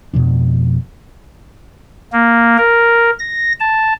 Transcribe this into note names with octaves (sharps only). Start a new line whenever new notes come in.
F2 B2 F3 D4
A#3
A#4
A#6
A5